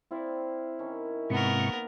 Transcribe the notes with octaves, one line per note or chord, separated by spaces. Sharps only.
C4 E4 D5 F5
D#3 C#4
G#2 C3 A#3 B3 A#4 C#6